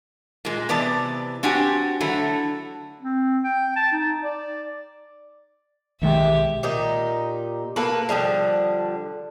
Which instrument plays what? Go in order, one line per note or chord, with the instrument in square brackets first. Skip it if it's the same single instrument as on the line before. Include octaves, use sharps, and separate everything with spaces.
[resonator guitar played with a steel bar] A#2 G#3
C3 E3 B3 D5 A5
C4 D4 F#4 G4 G#5
D3 F#3 A3 E4
[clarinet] C4
G5
A5
D#4
D5
[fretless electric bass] B1 D#3 G#3 [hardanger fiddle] G4 E5
[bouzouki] A#2 D#4 G4
A#3 A4 B4
D3 F3 G3 G#3